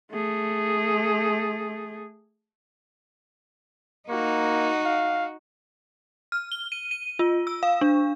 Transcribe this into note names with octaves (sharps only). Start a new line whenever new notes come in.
A3 G#4
A#3 D#4 F#4
F5
F6
G7
D#7
D#7
F4
E6
F5
D4